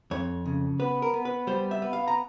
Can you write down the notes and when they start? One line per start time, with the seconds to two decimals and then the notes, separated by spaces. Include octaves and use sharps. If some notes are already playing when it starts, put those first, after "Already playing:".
0.11 F2 C#5
0.46 C#3
0.80 B3 B4
1.02 A#4
1.14 B3
1.25 B4
1.47 G3 C5
1.71 E5
1.82 B3
1.93 F5
2.08 A#5